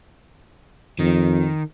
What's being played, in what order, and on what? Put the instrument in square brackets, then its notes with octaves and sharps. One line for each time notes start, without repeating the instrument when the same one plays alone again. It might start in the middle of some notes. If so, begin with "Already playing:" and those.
[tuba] F2 [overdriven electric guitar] D#3